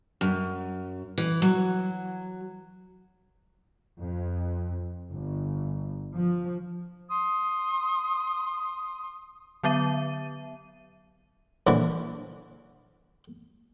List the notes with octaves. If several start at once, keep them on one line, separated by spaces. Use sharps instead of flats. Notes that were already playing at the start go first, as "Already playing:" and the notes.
F#2
E3
F#3
F2
G1
F3
C6 D#6
D3 F#3 B3 E5 D#7
A#1 D3 E3 D6